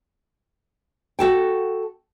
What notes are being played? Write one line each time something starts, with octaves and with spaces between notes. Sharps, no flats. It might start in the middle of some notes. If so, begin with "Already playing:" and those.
F#4 A4 G5